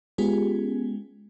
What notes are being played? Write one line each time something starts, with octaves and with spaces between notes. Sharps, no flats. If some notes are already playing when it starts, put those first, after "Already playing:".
G#3 B3 C#4 F4 G4 G#4